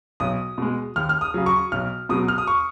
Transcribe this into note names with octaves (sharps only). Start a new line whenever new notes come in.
B1 D#6
B2 G#3
D#2 F6
F6
D#6
C#3 F#3
C#6
B1 F6
B2 F#3 D#6
F6
D#6
C#6